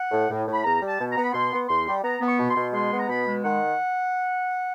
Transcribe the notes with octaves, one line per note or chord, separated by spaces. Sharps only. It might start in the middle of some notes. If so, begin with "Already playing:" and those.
Already playing: F#5
A2
A2
A2
B5
E2 A#5
G3
A5
B2
B3 A#5
B5
B2 C6
B3
E2 C6
G3
B3 A#5
B3
C#6
B2
C6
B2
G#3 C6
B3
A#5
B2 B5
G#3
D#3 F#5